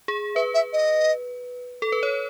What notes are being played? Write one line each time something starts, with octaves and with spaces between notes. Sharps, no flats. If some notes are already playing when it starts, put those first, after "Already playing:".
G#4
B4 E5
E5
D#5
A4
B4
C#5